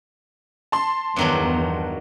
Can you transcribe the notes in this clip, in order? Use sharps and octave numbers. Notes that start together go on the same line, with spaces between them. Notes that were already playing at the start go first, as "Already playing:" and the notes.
A5 C6
E2 G2 D#3 F#3